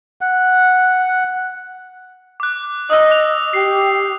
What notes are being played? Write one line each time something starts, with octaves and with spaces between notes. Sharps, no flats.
F#5
D6 F#6
D#5 D#6 E6
D6 F#6 F7
G4 C7